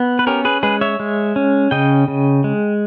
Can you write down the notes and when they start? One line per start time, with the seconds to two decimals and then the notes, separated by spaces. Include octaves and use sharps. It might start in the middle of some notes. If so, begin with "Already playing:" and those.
Already playing: B3
0.19 B4
0.27 C#4 G4 A#4
0.45 G#4 B4
0.63 G#3 G#4 B4
0.81 C#5 E5
1.00 G#3
1.36 C#4
1.71 C#3 D#5 G5
2.08 C#3
2.44 G#3